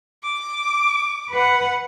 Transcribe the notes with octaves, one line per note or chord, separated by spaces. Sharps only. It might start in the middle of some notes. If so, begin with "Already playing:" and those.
D6
B4 F#5